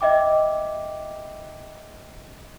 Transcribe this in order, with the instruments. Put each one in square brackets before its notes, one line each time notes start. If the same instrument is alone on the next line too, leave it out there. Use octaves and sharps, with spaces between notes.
[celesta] D#5 E5 G5 D6